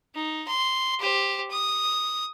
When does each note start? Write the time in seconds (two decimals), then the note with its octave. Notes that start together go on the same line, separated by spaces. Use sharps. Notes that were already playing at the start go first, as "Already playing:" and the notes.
0.15 D#4
0.48 C6
1.00 G4 C5
1.51 D#6